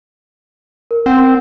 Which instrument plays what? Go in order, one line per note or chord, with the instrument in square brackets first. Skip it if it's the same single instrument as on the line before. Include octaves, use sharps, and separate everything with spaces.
[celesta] A#4
[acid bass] C4 [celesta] F#5